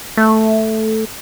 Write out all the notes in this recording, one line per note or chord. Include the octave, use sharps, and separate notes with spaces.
A3